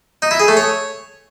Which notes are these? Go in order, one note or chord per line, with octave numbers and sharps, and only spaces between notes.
D#4
E4
G#4
A3
C#5